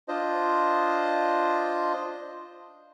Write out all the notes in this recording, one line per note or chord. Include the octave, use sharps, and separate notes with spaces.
D4 F4 C5 D#5